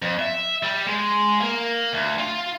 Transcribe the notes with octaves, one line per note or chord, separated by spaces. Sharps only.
F2
E5
G3
G#3
A#3
D2
F4